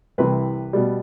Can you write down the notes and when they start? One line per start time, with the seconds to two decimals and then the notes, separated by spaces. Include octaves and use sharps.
0.18 C2 C3 E3 B4
0.73 B2 G3